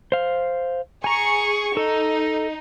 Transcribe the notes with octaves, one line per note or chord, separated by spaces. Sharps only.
C5 F5
G#4 G#5 A#5 C#6
D#4 A4